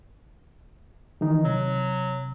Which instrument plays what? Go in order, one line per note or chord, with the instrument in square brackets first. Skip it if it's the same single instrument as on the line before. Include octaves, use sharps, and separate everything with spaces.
[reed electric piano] D#3 E3 D#4
[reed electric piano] C3 [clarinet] F#3